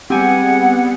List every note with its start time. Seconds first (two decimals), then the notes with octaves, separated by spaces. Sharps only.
0.10 G3 B3 C4 G4 G#4 F#5 G#5